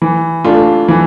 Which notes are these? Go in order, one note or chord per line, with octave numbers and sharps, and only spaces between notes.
E3
A3 D4 F4
E3